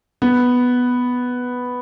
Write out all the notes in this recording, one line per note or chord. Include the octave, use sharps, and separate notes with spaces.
B3